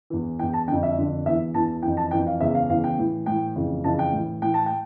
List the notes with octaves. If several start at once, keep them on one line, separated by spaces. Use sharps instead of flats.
E2 E3
E2 E3 G5
A5
F2 D3 G5
E5
F2 D3
E2 E3 E5
E2 E3 A5
F2 E3 G5
A5
F2 E3 G5
F5
E2 C#3 E3 E5
F5
E2 C#3 E3 F5
G5
A2 E3
A2 E3 G5
F2 C#3 E3
F2 C#3 E3 A5
G5
A2 E3
A2 E3 G5
A5
G5